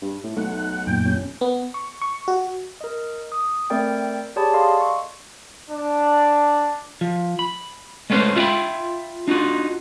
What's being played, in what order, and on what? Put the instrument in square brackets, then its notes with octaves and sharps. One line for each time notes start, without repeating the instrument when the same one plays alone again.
[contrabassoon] G2
A2
[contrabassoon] B1 [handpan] A3 D#4 [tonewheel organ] F#5
[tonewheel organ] F#2 A#2 G5
[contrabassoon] G1 [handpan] C#4
[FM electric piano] B3
C#6
C#6
F#4
[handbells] A#4 D#5
D#6
A3 C4 A4 A#4 D5 G5
G4 G#4 C#5 D5 A5 B5
A4 D5 D#5 F5 C6
C#6
[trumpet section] D4
[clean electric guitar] F3
B5
G#3 A3 B3 C#4 B4 C5
E4 F4 E5 F#5 G5 B5
D4 D#4 F4 F#4